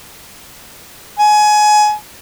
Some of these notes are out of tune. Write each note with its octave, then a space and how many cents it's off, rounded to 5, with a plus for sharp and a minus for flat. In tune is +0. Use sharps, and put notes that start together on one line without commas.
G#5 +25